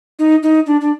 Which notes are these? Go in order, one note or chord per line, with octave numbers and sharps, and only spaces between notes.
D#4
D#4
D4
D4